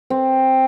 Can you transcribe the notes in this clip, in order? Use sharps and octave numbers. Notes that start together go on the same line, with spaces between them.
C4